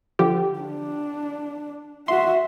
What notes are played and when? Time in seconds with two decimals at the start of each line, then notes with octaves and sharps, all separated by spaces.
0.19 D3 F3 G4
0.60 D4
2.08 F#4 E5 C6